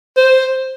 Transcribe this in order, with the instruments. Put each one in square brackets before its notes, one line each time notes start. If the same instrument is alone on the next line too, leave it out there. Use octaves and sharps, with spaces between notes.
[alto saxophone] C5